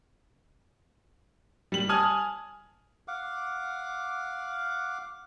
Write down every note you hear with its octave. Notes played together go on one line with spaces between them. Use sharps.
G3 F#7
G#5 A5 D#6 F6 G#6
F5 F#5 D6